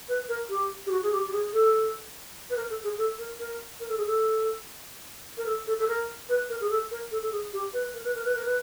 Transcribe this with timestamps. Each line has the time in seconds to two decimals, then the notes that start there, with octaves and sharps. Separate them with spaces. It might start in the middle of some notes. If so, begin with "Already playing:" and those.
0.09 B4
0.29 A#4
0.49 G4
0.86 G4
0.91 F#4
1.03 G#4
1.12 G4
1.28 G4
1.33 G#4
1.53 A4
2.50 B4
2.57 A#4
2.70 A4
2.84 G#4
2.98 A4
3.19 A#4
3.39 A#4
3.80 A#4
3.89 A4
3.97 G#4
4.06 A4
5.38 A#4
5.46 A4
5.67 A4
5.79 A4
5.88 A#4
6.29 B4
6.49 A#4
6.61 G#4
6.70 A4
6.91 A#4
7.12 A4
7.23 A4
7.32 G#4
7.53 G4
7.73 B4
7.94 A#4
8.04 B4
8.15 A#4
8.25 B4
8.35 A#4
8.45 B4